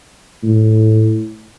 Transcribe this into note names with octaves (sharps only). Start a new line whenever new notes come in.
A2